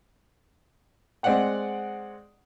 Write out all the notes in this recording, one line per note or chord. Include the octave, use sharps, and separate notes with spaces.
G#3 C4 D5 D#5 F#5 G5